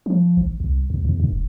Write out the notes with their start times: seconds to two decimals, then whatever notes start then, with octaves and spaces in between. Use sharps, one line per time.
0.06 F3
0.37 A1
0.60 C2
0.90 D2
1.05 E2
1.20 G2
1.32 D#1